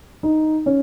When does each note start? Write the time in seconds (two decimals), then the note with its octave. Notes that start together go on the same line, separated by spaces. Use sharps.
0.23 D#4
0.66 C#4